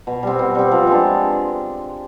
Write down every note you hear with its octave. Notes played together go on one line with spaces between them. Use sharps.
B2
G3 C4
B2
G3 C4
F3
G#3 B3 D4